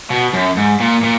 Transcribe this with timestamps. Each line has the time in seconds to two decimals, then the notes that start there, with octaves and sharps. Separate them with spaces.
0.10 B2
0.33 F#2
0.57 G#2
0.80 A#2
1.03 A#2